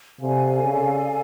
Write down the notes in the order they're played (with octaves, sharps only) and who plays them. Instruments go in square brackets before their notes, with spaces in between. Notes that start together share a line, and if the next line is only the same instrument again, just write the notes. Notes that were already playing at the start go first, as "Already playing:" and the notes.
[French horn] C3 [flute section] A4 D5 F5 G#5
[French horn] C#3